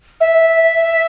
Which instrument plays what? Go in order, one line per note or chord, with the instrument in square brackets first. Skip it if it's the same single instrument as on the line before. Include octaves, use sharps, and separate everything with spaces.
[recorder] E5